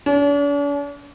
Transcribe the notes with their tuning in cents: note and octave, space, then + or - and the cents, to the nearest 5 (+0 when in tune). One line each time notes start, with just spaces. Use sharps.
D4 -45